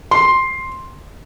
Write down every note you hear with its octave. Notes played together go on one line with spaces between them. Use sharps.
C6